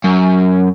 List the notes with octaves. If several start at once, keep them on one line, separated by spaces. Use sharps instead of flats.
F#2